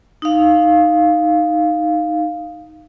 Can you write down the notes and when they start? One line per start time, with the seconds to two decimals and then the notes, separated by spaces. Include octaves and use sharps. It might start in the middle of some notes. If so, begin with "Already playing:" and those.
0.22 D#4 F5